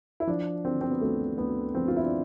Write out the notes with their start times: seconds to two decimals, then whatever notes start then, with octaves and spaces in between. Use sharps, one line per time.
0.20 E4
0.27 F3 D4
0.65 D3 C4
0.81 C4
0.91 B3
1.01 D2 A3
1.38 D2 B3
1.75 F3 C4
1.88 F4
1.96 E4
2.04 D4